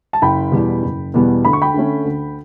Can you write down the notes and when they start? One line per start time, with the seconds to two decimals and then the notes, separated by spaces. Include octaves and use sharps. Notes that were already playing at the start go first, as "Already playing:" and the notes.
0.13 A5
0.22 F#1 G5 B5
0.52 E2 B2 G3 B3
0.83 F#1
1.14 E2 B2 G3 B3
1.45 D2 B5
1.53 C#6
1.62 G5 B5
1.74 D3 A3 C#4
2.05 D2